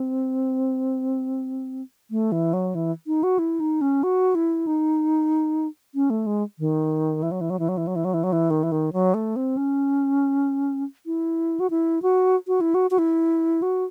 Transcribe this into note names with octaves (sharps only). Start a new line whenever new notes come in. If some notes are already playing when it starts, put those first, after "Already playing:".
Already playing: C4
A3
E3
F#3
E3
D#4
F#4
E4
D#4
C#4
F#4
E4
D#4
C#4
A3
G#3
D#3
E3
F#3
E3
F#3
E3
F#3
E3
F#3
E3
F#3
E3
F#3
E3
D#3
E3
D#3
F#3
A3
C4
C#4
E4
F#4
E4
F#4
F#4
E4
F#4
F#4
E4
F#4